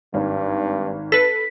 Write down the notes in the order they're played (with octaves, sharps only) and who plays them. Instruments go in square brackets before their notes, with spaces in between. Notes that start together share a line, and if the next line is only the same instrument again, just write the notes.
[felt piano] G#1 [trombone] G2
[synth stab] A4 B4 [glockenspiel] B6